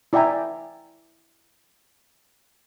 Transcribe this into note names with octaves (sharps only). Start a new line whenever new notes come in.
E4 D5 E5 G5 G#5 A#5